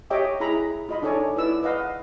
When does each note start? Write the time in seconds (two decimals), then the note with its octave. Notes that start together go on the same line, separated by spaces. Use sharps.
0.10 G4 C#5 D#5 E5 G5 D6
0.40 E4 G#4 E5 A#5 B5
0.89 F4 D#5 B5
1.02 D4 D#4 A4 C#5 D5 G#5
1.37 E4 B4 D5 E6
1.63 B4 D#5 F5 F#5